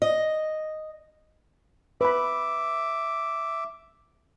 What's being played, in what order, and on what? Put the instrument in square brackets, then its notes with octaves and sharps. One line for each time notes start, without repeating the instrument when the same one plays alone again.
[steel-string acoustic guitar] D#5
[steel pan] B4 B5 [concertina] E5 D6